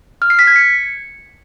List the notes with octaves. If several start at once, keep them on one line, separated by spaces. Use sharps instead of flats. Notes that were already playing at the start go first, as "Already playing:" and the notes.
F6
C7
B6
G#6
C#7